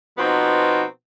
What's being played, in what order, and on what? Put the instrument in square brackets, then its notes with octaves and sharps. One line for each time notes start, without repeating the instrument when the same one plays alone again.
[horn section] B2 F3 B3 C4 D#4 F#4